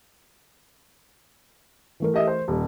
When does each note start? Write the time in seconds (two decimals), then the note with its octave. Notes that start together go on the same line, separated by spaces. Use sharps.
2.00 E3 A3 A#4
2.14 G4 D#5 E5
2.27 C5
2.48 D#1 G3